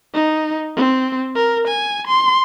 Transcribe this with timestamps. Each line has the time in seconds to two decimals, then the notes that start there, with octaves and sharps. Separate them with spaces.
0.14 D#4
0.76 C4
1.35 A#4
1.67 G#5
2.07 C6